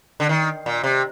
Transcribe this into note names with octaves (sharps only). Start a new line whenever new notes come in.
D3
D#3
A#2
C3